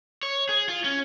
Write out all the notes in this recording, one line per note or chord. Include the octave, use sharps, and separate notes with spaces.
C#5
G#4
F4
C#4